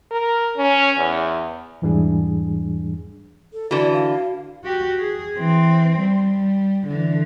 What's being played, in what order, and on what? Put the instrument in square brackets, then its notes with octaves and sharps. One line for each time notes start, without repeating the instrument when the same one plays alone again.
[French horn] A#4
C#4
E2
[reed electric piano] E2 G#2 E3 G3 D4 G#4
[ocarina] A4
[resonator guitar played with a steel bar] D3 E3 [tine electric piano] F#4 [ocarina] D5
[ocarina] F5
[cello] F#4 G4
G#4
E3 C4
G3
D3 E3